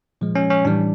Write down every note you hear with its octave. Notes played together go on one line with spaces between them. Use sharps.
A#2 F3 G#3
C#4
C#4
A2 E3 G3 D4